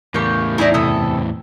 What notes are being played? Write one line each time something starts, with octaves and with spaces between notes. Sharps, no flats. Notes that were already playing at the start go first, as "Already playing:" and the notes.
E2 A2 A#3 G4 C#6
D#4 E4 G#4 D5 A#5
F#2 C3 E4 A4 D#6